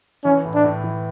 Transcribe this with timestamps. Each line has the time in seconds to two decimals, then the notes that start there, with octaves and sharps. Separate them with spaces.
0.24 E3 C#4
0.45 A2
0.54 D4
0.64 A2
0.84 E3